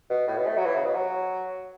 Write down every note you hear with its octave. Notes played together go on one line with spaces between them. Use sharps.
B2
A2
B2
A3
F#3
E3
C#3
B2
F#3